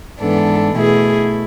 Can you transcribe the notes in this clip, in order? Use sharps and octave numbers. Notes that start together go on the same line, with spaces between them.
G#2 E3 B3 D4 A4
B2 A3 E4 G#4